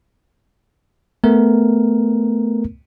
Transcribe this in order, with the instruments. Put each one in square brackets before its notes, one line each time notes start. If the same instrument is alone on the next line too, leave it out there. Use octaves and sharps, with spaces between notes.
[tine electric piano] A3 B3 A#4